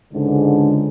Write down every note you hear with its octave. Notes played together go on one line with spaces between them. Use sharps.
C#2 G#2 D3